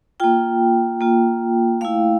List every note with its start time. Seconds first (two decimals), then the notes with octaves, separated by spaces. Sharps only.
0.20 A#3 F4 G5
1.01 A#3 F4
1.81 A3 E4 F5